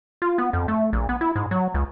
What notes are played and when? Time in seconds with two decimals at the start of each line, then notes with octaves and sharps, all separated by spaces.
0.22 F4
0.38 B3
0.53 F2
0.68 A3
0.93 A#1
1.09 B3
1.21 E4
1.36 G#2
1.51 F#3
1.74 C#2